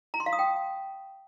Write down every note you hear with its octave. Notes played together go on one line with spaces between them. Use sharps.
A#5
C6
F5
D#6
G5